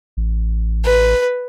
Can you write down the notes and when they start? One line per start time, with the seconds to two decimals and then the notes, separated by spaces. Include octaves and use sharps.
0.17 A1
0.85 B4